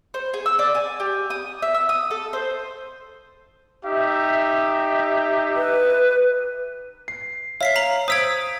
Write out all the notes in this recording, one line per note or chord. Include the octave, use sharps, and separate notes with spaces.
C5
G#4
E6
D5
G#5
G4
D#6
E5
E6
D#6
A4
C5
D#4 G4 E5
B4
C7
C#5 E5 F5 B6 C7
A#5 F#7
C5 D#6 E6 G#6 B6 D7